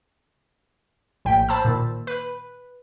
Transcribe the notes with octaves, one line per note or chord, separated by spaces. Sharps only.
A#1 A2 G5 B6
C5 A5 B5 E6
A#2 D#3
B4